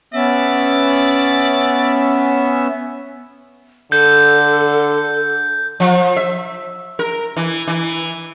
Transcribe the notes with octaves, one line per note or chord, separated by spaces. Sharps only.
B3 C#4 D5 E5
D3 A4 G6
F3
E5
A#4
E3
E3